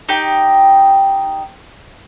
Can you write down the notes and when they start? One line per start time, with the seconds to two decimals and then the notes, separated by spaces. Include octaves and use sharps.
0.09 D#4 G4 G5